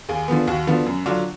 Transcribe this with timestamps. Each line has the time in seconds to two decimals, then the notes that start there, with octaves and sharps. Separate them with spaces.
0.09 D#2 G#4
0.28 D3 F3 B3
0.47 D#2 F#4
0.67 D3 F3 B3
0.86 F#2
1.06 D3 F#3 D4 F4